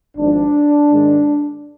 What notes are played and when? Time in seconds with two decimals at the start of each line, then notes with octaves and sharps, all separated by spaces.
0.17 G#1 G#2 F3 D4
0.91 G#2 D#3 G#3